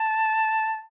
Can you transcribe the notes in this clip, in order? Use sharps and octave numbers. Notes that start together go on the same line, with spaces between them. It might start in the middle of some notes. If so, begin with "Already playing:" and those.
Already playing: A5